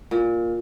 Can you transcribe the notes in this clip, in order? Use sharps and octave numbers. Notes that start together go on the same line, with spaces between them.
A#2